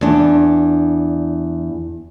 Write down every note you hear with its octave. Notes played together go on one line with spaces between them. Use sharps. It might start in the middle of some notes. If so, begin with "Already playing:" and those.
E2 D4